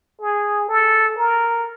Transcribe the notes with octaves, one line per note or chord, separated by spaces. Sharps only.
G#4
A4
A#4